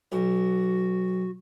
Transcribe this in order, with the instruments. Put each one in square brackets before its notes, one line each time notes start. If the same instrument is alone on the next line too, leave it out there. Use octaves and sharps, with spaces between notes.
[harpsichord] B1 [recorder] F#4